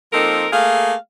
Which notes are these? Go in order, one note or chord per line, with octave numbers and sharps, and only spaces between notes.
F3 A#3 C4 D#4 A4 A#4
A3 A#3 G#4 F5